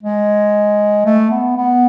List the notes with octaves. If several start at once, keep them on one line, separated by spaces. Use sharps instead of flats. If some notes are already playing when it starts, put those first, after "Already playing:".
G#3
A3
B3
B3